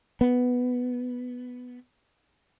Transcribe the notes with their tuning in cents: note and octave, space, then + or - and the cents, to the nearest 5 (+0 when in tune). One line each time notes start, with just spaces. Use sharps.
B3 +5